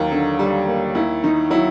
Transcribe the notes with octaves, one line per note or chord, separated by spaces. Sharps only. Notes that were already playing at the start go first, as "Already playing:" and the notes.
Already playing: D#2 F#3 A#3 F4
D3
G3
A#3
D#2 E4
D#3 D#4
F#3 E4